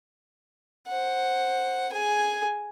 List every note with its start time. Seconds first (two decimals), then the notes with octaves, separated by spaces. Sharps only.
0.87 C5 F#5
1.92 G#4 G#5